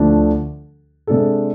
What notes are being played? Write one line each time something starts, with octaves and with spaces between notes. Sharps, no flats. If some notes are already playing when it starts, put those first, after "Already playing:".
Already playing: D2 D3 F3 A3 D4
C3 G#3 D4 A4